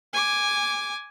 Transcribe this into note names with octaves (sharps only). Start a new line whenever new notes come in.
G#5 D6